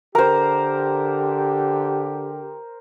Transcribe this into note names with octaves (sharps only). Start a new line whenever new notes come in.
D3 G4 A#4 C5